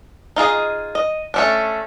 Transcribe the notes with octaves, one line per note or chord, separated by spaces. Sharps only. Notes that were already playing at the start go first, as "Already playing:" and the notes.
D#4 F4 G#4 D#5
D#5
A3 C#4 D4